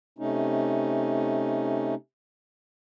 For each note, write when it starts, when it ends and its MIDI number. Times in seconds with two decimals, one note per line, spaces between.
0.19 1.95 48
0.19 1.95 57
0.19 1.95 61
0.19 1.95 63